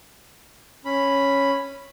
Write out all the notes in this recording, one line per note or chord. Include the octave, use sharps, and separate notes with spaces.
C#4 B5